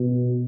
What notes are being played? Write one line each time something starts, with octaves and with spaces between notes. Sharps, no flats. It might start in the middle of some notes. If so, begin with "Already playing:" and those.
Already playing: B2